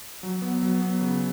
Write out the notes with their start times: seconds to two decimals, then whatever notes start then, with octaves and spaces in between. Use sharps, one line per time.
0.23 F#3
0.42 B3
0.63 F#3
0.82 B3
1.01 C#3